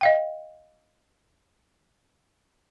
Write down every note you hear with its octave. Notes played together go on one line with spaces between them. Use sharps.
D#5 F5 G5